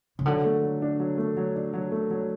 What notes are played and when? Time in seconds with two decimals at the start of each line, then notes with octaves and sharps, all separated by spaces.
0.19 C#3
0.26 D3 F#3
0.45 A3
0.63 F#3
0.82 D4
1.00 F#3
1.18 A3
1.37 F#3
1.55 D4
1.74 F#3
1.92 A3
2.11 F#3